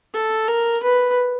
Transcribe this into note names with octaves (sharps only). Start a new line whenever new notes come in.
A4
A#4
B4